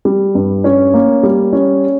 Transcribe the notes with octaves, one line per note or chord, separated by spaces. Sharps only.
G3
G2
C#4
A#3
G3
C#4